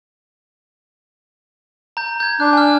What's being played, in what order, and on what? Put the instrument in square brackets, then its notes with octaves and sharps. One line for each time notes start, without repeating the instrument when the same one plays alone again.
[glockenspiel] A#5 G6
G6 G#6
[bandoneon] D4 [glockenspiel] F#6
[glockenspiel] G#5 F6